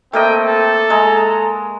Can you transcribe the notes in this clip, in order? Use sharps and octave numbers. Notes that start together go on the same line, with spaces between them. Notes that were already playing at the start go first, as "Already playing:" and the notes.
A3 A#3 C4 D#5 G5
A4
G#3 A#5